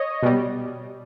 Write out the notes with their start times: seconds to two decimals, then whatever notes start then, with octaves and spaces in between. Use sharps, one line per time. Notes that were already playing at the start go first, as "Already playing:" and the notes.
Already playing: C#5 D#5
0.22 B2 G3